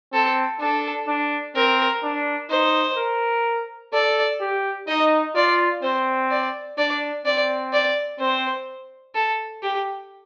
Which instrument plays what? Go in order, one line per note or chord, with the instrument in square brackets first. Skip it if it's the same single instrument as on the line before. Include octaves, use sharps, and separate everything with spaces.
[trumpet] C4 [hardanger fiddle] A4
[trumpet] D4 [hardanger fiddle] A4
[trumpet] D4
[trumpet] C4 [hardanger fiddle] A#4
[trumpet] D4
[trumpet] D#4 [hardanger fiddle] C5
[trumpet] A#4
[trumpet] A4 [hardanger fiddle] D5
[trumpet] G4
[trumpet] D#4 [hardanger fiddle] D#5
[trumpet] F4 [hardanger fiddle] D5
[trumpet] C4 [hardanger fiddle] C5
[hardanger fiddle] D5
[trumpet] D4 [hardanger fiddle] D5
[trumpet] C4 [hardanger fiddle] D5
[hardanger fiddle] D5
[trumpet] C4 [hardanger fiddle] C5
[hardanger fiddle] A4
G4